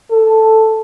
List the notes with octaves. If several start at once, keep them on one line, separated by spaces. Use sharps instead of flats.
A4